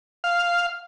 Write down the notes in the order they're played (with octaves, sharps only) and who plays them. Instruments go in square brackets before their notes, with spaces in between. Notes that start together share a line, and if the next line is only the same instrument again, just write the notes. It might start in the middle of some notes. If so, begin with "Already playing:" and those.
[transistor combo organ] F5